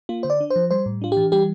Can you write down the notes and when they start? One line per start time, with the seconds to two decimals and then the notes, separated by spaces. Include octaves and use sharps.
0.09 A#3 F4
0.23 D3 C5
0.30 D5
0.41 D4
0.50 C5
0.56 F3
0.71 G3 C5
0.86 A2
1.02 D4 F4
1.12 E3 G4
1.32 G3 G4